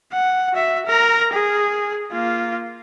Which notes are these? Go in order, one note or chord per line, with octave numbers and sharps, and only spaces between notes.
F#5
F#4 E5
A#4 A#5
G#4
A#3 F4